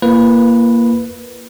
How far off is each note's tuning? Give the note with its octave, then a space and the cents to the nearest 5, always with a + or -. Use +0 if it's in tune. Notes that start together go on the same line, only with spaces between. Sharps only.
A#3 +0 F4 -45 B4 +0